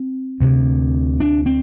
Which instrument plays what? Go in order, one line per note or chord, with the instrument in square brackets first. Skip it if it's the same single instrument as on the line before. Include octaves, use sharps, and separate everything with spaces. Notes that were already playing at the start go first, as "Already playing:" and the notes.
Already playing: [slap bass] C4
D2 C3
D4
C4